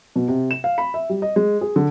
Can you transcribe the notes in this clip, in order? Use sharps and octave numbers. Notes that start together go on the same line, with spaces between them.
B2
C3
E7
F5
B5
E5
G3
D#5
G#3
G#4
D3